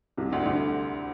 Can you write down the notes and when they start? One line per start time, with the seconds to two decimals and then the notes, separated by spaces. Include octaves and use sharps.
0.17 C2 C3
0.31 D2 D3
0.46 D2 D3